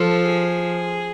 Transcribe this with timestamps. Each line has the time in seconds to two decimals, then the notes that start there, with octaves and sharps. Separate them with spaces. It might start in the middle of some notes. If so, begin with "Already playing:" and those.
Already playing: F3 A4
0.25 G#4